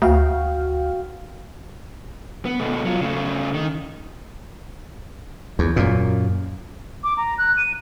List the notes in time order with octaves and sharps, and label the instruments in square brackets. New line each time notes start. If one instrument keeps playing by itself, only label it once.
[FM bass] D2 [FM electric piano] F#4 F5 G5
[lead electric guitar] B3
B2 A3
F#3 F4
C#3 A3
D#3
[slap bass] E2
F#2 A#2
[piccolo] D6
A#5
F#6
D#7